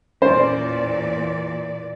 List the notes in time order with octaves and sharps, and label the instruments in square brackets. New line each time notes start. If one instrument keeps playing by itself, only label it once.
[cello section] E2 A#2 D5 [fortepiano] C#4 C5